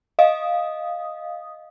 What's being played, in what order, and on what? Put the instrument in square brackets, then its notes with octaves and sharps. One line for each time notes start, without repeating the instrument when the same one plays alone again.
[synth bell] D#5 F5 D#6